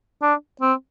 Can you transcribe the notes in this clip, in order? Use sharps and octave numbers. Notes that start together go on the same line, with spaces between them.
D4
C4